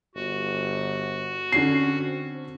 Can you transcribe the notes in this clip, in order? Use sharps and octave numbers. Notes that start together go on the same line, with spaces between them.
G1 F#4
D3 C4 C#4 C7